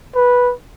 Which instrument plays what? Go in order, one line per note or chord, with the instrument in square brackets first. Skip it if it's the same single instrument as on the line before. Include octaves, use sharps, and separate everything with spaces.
[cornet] B4